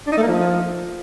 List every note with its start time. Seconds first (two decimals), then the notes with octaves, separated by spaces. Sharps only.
0.07 D4
0.12 D#4
0.17 A3
0.22 A#3
0.28 F3